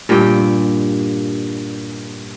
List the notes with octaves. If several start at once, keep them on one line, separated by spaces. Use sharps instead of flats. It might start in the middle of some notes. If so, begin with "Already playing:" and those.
G2 A#2 G4 G5